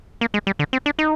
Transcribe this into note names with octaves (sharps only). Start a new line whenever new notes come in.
A#3
G#3
G3
D3
C4
D4
D#4